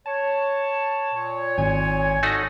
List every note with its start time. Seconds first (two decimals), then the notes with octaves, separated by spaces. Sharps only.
0.06 C#5 A5
1.13 A#2 C#5
1.58 G#1 G#5
2.23 A3 D#4 F#4